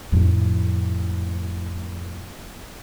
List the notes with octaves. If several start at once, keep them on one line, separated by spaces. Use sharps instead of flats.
F2 A2